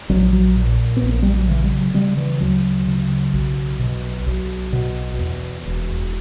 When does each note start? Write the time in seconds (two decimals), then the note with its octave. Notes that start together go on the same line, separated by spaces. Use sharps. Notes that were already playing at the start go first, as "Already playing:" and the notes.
0.09 A#1 F#3
0.33 F#3
0.56 A#2
0.97 B3
1.02 A#1
1.09 A#3
1.22 G3
1.36 F#3
1.48 C#3 E3
1.64 G3
1.72 F#3
1.94 C#3 G3
2.17 E3
2.41 D2 F#3
2.87 C#3
3.34 B1
3.79 B2
4.26 B1
4.73 B2
5.19 E2
5.66 E1